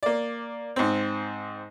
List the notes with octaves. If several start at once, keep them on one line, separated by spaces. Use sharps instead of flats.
A#3 D5
G#2 C4